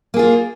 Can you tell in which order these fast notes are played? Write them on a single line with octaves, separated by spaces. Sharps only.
A#3 G#4 F4